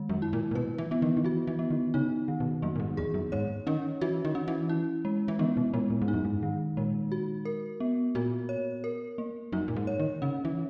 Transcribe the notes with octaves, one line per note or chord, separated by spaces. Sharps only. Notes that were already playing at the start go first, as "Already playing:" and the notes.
Already playing: D#3 G#3
F#2
E4
A#2
A#2
B2 B4
E3
E3 B3
D#3
D#3
E3 F#4
E3
B3
D#3
C#3 D#4
D#3
B2
F#2 A#3
A#2
G#2
E2 G#4
F#2
G#2 C#5
D#3 C#4
E3 F#4
D#3
C#4
E3
E4
G#3
E3
D#3 B3
B2
A#2 G#3
A#2
G#2
D#4
F#2
G#2
D#3
A#2 G#3
F#4
A#4
B3
A#2 F#4
C#5
A#4
A#3
F#2 D#4
A#2
G#2
C#5
D#3
C#3 C#4
E3